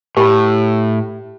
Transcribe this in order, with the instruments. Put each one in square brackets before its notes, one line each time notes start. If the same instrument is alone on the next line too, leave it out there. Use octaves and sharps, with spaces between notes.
[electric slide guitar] A2 [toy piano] G4 B5